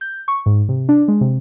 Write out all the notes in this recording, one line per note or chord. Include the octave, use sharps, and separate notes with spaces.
G6
C#6
G#2
C3
D4
G#3
C3